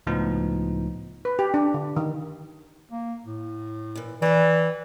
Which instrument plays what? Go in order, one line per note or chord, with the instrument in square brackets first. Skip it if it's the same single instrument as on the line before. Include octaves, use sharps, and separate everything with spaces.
[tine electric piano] C#2 A2 F3 B3 D#4
[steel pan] B4
G4
D4
D3
D#3
[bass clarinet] A#3
A2
[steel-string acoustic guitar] A#2 E3
[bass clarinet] E3 [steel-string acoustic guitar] G4 D5